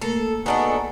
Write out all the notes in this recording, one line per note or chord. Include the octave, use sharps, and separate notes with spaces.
A3 A#3 A4 A#4
B3 D4 D#4 F#4 G#4 A4